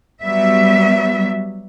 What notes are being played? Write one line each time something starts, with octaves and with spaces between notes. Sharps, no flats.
F#3 G3 B3 E5